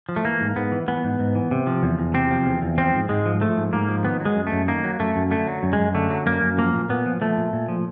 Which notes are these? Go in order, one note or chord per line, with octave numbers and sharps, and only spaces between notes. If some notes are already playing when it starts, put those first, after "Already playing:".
F3
A3
E3 A#3
G#2
G#2 B3
E3
E3 B3
G#2
G#2
E3
C3
F3
E2
E2
C3 C4
F3
E2
E2
F3 C4
G#2
G#2 G#3
F3
F3 A3
G#2
G#2 A#3
F3
D#3 B3
F#3
G#3
F#2
A3
F#2
D#3 A#3
F#3
F#2 A3
F#2
D3 A3
F#3
F#2
G#3
F#2
D3 A3
F#3
F#2 A#3
F#2
F3 A#3
A#2
A#2 B3
F3
F3 A3
A#2
A#2
F3